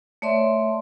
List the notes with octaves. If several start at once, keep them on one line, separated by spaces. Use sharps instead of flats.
A3 C#5 D5 E5 C6